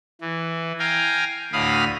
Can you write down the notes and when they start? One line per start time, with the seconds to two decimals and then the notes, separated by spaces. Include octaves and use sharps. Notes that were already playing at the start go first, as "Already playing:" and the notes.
0.21 E3
0.79 F5 G5 G#5 A#5
1.53 D2 A2 F5 B5 D#6 F6